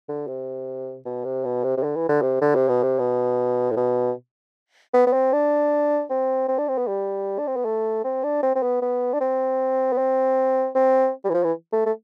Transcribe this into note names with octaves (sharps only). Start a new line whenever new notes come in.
D3
C3
B2
C3
B2
C3
C3
D3
E3
D3
C3
D3
C3
B2
C3
B2
A2
B2
B3
B3
C4
D4
C4
C4
D4
C4
B3
G3
D4
C4
B3
A3
C4
D4
C4
C4
B3
B3
D4
C4
B3
C4
C4
G3
E3
F3
E3
A3
A3